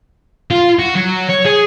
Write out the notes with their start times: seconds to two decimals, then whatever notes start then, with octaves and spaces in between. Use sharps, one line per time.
0.51 F4
0.79 F#4
0.96 F#3
1.29 C#5
1.46 G#4